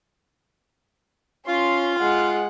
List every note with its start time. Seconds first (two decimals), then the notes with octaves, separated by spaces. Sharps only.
1.47 C#4 F4 C6
1.99 G#3 F#5